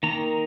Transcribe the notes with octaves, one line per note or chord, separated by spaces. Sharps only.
D#3 A#3 A#5